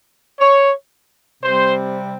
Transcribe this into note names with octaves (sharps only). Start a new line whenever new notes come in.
C#5
C3 G3 C4 C5